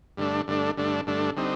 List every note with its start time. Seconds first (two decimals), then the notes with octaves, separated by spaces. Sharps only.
0.17 G2 D3 A3 D4
0.47 G2 D3 A3 D4
0.77 G2 D3 A3 D4
1.07 G2 D3 A3 D4
1.36 D3 G3 C4 D#4